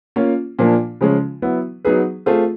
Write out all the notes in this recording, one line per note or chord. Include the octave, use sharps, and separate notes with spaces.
A#3 C#4 F4
A#2 F3 A#3 D4
C#3 F3 G#3 C#4
F#3 B3 E4
F#3 B3 D#4 G#4 B4
A3 C4 F4 G#4